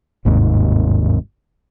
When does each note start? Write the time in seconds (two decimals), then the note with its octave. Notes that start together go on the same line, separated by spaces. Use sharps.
0.25 G1 D#2 G#2 C3